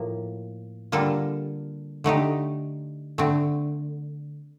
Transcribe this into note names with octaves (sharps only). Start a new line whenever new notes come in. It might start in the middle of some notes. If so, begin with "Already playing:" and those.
Already playing: A2 F3 A#3
D3 G3 A#3 F4 A4
D3 A3 D#4 G4
D3 A3 C4